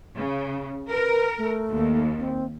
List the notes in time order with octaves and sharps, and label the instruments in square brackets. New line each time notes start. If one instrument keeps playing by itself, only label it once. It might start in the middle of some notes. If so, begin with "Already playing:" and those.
[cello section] C#3
[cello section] A#4 [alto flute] B4
[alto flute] A3
[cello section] D#2
[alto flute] C4